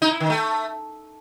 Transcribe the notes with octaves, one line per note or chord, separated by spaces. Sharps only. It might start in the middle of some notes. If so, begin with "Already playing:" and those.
D#4
E4
D#3
A3